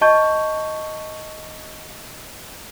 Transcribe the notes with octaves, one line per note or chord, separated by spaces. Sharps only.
D#5 A5 C#6 G6